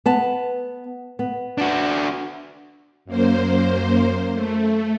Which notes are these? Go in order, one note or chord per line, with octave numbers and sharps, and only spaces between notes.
B3 A5
B3
D4 F#4
F#2 A#3 C5
A3